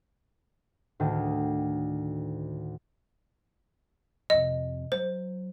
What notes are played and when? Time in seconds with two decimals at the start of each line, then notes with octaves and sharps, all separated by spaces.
1.00 D2 A2 D#3
4.30 F2 C3 D#5
4.92 F#3 C5